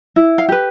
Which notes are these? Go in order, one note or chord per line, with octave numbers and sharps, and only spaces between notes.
E4
F5
G4 B4